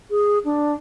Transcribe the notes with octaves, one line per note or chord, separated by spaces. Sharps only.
G#4
D4